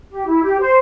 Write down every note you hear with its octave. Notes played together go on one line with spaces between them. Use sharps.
G4
E4
G4
C5